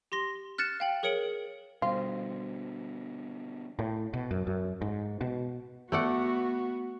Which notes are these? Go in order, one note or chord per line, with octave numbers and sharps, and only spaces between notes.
G4 C6 A#6 G7
F6 F#6 A6 C#7 E7
F5 G5 F#7
G#4 A#4 C#5 C#7 D7 F#7
B2 D3 G3 F4 C5
A2
B2
F#2
F#2
G#2
B2
A3 B3 F#4 D5 F#5